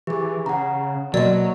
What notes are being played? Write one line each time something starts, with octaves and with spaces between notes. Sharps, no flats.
E3 G4 G#4
C#3 F#5 A#5
B2 F#3 A#3 F#4 A#4 D5 D#5